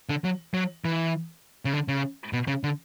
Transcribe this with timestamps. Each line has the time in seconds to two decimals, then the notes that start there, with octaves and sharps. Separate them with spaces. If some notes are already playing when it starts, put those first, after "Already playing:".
0.09 D3
0.24 F#3
0.54 F#3
0.85 E3
1.65 C#3
1.73 D3
1.88 C#3
2.33 B2
2.48 C#3
2.64 D3